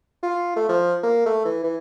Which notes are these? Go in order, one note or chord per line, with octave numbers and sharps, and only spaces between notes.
F4
A3
F3
A#3
A3
E3
E3